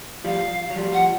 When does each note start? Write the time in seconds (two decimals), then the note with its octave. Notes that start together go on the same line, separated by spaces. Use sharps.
0.24 F3 G3 F5
0.70 F#3
0.76 F3 G3
0.93 F#5